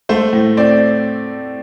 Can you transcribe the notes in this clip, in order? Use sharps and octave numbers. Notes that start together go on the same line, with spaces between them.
A3 C5
A2
C4 D5